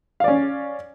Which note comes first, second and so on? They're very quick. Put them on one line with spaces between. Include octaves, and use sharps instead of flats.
F5 D5 C#4